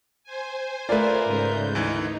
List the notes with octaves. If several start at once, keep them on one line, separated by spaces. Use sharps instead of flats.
C5 G#5
A3 F4 A#4 B4 D5
G#2 C#3 G6
D2 E3 D#4